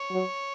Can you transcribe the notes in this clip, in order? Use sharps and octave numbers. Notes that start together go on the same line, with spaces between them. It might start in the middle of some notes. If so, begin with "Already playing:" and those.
Already playing: C#5
F#3